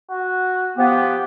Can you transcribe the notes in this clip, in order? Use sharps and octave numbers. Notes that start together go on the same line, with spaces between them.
F#4
F3 B3 G4